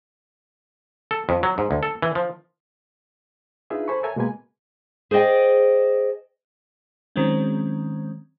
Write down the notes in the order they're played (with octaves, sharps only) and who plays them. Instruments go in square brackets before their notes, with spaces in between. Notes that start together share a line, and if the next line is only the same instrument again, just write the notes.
[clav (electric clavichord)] A4
F2
F#3
G#2
D2
A4
E3
F3
[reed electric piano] D4 D#4 F4 G#4 B4 E5
A4 C5 G#5 B5 C#6
A4 A#4 C#5 E5 G#5 G#6
B2 G#3 A#3 B4 G#5
[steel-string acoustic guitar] G#4 C5 D5 D#5 G5
[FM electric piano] D#3 F#3 G#3 C4 C#4